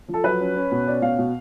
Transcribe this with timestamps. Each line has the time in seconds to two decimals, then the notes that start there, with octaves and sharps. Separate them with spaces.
0.08 F3
0.14 A4
0.24 F#3 B4
0.39 C#4
0.56 C#4
0.72 B2
0.86 C#4 D5
1.02 B2 F5
1.18 B2